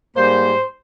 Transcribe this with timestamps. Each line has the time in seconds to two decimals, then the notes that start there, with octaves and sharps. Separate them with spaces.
0.16 G#2 G3 A#3 C5